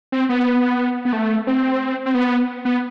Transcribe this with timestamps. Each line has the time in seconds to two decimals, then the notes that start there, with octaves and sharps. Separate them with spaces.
0.12 C4
0.29 B3
1.05 B3
1.13 A3
1.47 C4
2.06 C4
2.15 B3
2.65 B3